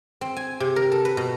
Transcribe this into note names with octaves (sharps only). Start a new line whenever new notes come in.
C4
G#5
C3
A#4
A4
B4
B2